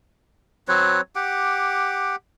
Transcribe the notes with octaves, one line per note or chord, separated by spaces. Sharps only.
F#3 C4 B4 C#5
G4 F#5 D6